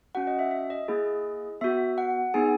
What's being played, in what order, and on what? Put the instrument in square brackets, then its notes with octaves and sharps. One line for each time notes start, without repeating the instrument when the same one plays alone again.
[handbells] C#4 F#4 F#5
D#5
E5
E5
D#5
A#3 E4 G#4
B3 F#4 E5
F#5
B3 D#4 G#4 G#5